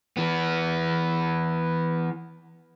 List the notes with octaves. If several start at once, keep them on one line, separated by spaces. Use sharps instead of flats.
E3 B3